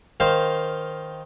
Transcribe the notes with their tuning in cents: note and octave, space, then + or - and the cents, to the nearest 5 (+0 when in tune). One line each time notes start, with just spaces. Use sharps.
D#3 +5 C5 +0 F5 +0